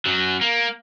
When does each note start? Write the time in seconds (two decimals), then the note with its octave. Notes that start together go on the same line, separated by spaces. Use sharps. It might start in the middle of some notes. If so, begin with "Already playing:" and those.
0.06 F#2 F#3
0.41 A#3